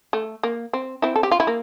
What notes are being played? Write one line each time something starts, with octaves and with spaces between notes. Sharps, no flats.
A3
A#3
C4
C4 E4
A4
G4
F4
E4
A#3